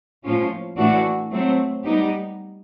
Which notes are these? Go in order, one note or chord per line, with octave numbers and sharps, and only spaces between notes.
A2 F3 A#3 C#4 F4
A2 E3 A3 D4 F#4
F#3 A3 C4
G3 B3 D#4 G4